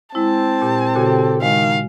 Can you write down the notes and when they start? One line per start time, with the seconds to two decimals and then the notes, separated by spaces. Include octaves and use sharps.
0.15 G#3 C4 E4 A5
0.62 A#2 G4
0.95 A#2 C#3 F#4 G4 A4
1.42 D#3 G#3 F5